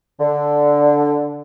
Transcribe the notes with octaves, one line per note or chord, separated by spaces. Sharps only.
D3